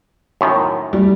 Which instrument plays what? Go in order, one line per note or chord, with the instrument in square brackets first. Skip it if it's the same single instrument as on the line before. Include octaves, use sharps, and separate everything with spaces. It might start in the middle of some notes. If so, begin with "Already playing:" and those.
[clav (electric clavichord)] F#2 A2 D#3
[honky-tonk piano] G3